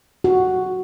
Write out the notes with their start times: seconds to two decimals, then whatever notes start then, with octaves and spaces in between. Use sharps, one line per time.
0.24 F#4